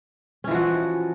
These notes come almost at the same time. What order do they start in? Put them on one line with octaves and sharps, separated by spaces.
C#4 E3 F3 F#4